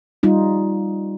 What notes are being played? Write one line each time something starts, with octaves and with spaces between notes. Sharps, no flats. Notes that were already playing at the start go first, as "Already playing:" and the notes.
G3 D#4 F4